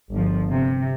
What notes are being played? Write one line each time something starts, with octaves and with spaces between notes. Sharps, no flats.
G1 F3
C3